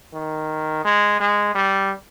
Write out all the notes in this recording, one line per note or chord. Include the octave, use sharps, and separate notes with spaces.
D#3
G#3
G#3
G3